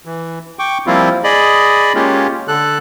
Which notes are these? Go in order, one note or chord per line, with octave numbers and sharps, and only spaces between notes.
E3
G5 C#6 D6
F3 G3 A#3 C4 E4 F4
G#4 D5 D#5 B5
G#3 A#3 C#4 F4 G4
D3 A4 F#6